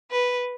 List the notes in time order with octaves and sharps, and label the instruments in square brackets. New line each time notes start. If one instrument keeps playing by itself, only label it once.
[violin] B4